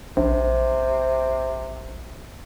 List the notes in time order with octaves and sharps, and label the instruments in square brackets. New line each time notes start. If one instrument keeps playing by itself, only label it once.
[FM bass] A#1 [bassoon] C3